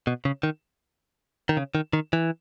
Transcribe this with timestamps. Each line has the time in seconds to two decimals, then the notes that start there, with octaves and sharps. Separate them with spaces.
0.07 B2
0.25 C#3
0.43 D#3
1.49 D#3
1.57 C#3
1.75 D#3
1.93 D#3
2.13 E3